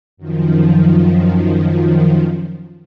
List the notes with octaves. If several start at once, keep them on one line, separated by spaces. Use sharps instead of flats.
F#2 D#3 F3